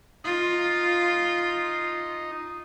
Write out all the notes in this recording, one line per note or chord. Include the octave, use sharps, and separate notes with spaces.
D#4 F4